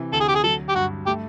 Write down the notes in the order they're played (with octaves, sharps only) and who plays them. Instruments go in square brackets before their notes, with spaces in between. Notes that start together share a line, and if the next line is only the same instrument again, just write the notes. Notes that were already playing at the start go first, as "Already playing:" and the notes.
Already playing: [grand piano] C3 E3
[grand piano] D2 [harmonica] A4
[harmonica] G#4
G4
G#4
[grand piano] F#3 [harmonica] A4
[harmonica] G4
[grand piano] G2 [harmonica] F#4
[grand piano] A3 [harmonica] G4